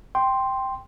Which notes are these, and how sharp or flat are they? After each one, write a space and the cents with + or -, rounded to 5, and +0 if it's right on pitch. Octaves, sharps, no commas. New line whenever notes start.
G5 +0 C6 +0